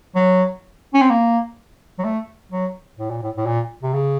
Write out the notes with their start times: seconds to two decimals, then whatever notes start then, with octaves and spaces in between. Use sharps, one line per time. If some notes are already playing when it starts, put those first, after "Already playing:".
0.15 F#3
0.94 C#4
1.02 C4
1.10 A#3
1.99 F#3
2.05 A3
2.52 F#3
2.99 A2
3.10 A#2
3.22 A2
3.37 A2
3.46 A#2
3.83 C3
3.93 C#3